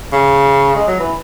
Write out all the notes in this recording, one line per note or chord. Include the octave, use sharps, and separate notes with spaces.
C#3
G#3
F#3
E3